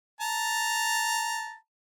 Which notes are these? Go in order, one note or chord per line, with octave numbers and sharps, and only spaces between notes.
A5 A#5